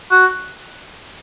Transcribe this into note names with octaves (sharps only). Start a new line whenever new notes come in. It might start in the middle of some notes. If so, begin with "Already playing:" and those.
F#4